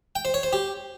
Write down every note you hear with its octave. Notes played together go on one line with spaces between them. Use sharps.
G5
C5
C#5
C5
G4